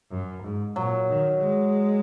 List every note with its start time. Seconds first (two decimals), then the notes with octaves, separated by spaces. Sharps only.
0.11 F#2
0.43 G#2
0.76 A#2 F#3
1.09 D#3
1.41 G#3